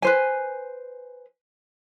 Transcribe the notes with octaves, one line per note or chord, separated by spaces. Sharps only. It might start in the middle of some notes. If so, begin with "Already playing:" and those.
B4 C5 G#5